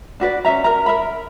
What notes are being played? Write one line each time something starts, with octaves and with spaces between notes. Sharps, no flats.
D4 F#4 B4 D5
C#4 D4 E5 A#5
A#4 A#5
A#4 E5 B5